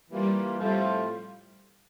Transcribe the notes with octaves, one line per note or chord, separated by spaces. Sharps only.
E3 G3 A#3 F4
A2 F3 G3 A3 C4 F4